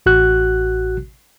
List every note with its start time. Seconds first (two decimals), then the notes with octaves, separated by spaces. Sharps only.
0.06 A1 F#4 F#6